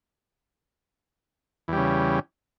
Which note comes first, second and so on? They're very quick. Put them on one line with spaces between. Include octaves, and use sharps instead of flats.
E2 G3 C#3